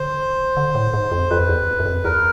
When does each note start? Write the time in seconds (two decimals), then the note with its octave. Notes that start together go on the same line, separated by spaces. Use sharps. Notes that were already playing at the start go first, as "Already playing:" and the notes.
Already playing: D3 C5
0.57 D3
0.75 A2
0.94 G#2
1.12 F2
1.30 F2 B4
1.49 E2
1.79 F#2
1.86 F2
2.04 E2 A#4